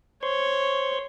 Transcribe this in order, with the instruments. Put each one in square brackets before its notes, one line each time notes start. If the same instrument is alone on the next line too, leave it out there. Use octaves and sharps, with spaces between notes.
[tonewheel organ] C5 C6 C#6 [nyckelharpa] C#5